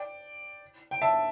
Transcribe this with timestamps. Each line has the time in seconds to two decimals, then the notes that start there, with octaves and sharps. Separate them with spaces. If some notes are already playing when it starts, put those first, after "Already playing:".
Already playing: D5 G5
0.91 G5
1.02 E5 A5